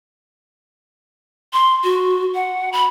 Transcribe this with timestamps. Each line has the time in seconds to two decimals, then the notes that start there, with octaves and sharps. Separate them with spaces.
1.53 C6
1.84 F#4
2.35 F#5
2.73 B5